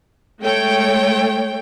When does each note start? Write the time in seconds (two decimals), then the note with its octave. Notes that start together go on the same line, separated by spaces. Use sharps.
0.42 G#3 A3 C#5 G5